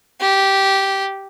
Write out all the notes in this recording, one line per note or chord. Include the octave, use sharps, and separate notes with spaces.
G4